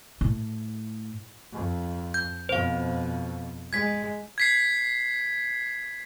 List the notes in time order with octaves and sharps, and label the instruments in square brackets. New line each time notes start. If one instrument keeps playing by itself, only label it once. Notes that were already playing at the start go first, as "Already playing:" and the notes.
[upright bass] A2
[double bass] F2
[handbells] G6
[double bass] F2 B2 [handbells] C5 F5
[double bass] G#3 [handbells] G#6 B6
[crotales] G#6 B6 C7